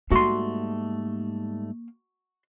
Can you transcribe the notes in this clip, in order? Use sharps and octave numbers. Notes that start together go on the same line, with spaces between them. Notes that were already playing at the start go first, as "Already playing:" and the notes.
G#2 G3 A3 A#3 F#4 C6